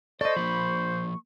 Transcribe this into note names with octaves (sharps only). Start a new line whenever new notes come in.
A4 C5 D5 D#5 C#6
F3 A#3 B5